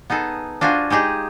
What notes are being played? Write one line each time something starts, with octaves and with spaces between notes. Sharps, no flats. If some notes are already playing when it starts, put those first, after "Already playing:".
B3 D#4 G#4 A4
D4 F4 F#4 C5 G#5
G#3 D#4 G4 G#4